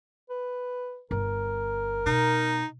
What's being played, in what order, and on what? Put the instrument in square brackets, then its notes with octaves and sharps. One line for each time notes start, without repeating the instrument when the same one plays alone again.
[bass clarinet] B4
[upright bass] G1 [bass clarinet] A#4
[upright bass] B2 [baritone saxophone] D#4